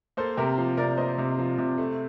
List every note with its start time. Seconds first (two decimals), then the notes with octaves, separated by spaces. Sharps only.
0.17 A#3 A4 C5
0.37 C3 G4 A#4
0.58 F3
0.77 C3 A#4 D5
0.97 A#3 C5 D#5
1.18 C3
1.38 F3
1.58 C3
1.78 A3